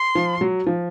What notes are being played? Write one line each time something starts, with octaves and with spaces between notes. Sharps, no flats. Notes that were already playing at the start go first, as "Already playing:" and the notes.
Already playing: C6
F3
F#3
F3